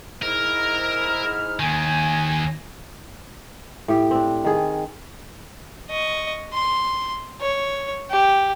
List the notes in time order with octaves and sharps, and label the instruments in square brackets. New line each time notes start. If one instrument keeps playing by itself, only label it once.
[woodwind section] G#2 E4 F6 [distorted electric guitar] A#4
[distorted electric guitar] D#2 D#3 [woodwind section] G#5
[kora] A2 G4
C4 D4
D#3 G#4
[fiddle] D#5 C#6
C6
C#5
G4